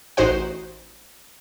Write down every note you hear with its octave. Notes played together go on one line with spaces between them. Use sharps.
A1 D#4 F#4 C5 F#5